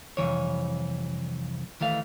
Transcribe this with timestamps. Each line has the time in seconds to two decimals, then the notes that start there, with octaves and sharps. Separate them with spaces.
0.17 C2 F2 A#2 E3 C#5
1.80 D#3 E3 A3 F5